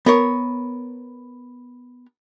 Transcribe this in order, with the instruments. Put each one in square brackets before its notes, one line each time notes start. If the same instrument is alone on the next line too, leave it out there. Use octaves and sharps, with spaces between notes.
[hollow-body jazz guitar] B3 A#4 C#5